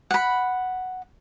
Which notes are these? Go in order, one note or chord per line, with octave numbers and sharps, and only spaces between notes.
F#5 B5